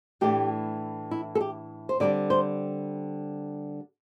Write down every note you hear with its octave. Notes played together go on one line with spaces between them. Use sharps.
A2 E3 A3 D4 G4
E4
A4
G4
C5
D3 G3 C4 D5
C5